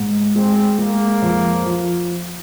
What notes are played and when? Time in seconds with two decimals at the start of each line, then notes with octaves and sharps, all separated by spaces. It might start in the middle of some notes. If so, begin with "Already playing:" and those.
Already playing: G#2
0.36 G#3 C4
0.78 G#3 A#3
1.22 F2
1.65 F3